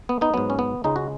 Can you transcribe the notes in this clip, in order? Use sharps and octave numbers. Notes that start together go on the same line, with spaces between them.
B3
B3 D#4
G#2 F#3 B3
C#4
B3
C#2 C#3 G#3 D#4
F#4